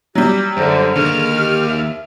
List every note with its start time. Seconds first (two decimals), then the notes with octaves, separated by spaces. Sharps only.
0.15 F#3 G3 G4
0.57 F#2 D3 C5
0.96 D#2 D3 D#3 G#4 F6
1.38 G4
1.69 E5